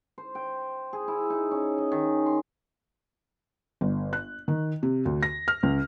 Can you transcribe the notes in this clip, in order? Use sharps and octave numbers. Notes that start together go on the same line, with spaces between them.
C5
G5
G#4
E4
D#4
C#4
D#5
D#3
C6
G1
F#6
D#3
C3
D2
A#6
F6
C#2